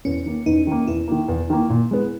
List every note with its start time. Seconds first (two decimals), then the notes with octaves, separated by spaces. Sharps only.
0.05 E2 C#4
0.26 D#3 A#3
0.46 E2 D#4
0.67 D#3 A#3
0.87 E2 E4
1.08 D#3 A#3
1.28 E2
1.50 D#3 A#3
1.70 A#2
1.91 G#3 B3